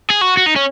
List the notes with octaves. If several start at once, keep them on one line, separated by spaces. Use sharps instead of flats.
G#4
F#4
F#4
D#4
C#4